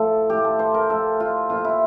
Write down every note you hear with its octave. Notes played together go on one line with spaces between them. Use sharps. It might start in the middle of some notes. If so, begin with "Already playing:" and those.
Already playing: A2 F3 A4
A2 F3 G4
A4
C5
A#4
A2 F3 A4
F4
A#2 F3 F4
E4